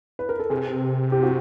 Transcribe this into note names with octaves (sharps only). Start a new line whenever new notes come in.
B4
A#4
A4
C3 G#4
G4
F#4